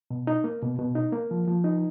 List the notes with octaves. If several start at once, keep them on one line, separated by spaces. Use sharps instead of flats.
B2
D#4
A#3
B2
B2
D#4
A#3
F3
F3
D#4